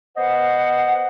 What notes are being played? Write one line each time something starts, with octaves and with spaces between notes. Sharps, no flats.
B3 C5 D#5 F#5